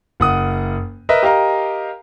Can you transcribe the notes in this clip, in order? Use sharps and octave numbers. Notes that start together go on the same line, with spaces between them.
F#1 F#5 D#6
A#4 B4 D#5 E5
G4 A#4 D#5 F5 A#5